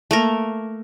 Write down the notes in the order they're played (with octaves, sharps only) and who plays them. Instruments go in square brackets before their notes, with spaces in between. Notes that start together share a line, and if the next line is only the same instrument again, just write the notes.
[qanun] A3 A#3 A#4